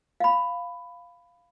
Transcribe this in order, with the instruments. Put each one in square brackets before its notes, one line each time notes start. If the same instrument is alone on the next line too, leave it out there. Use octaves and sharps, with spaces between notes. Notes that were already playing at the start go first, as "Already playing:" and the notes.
[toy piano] F5 B5